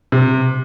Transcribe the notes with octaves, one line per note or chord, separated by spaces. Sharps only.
C3